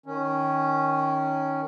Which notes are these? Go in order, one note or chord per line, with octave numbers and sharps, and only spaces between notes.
D#3 C#4